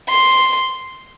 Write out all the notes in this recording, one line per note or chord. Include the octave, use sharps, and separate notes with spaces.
C6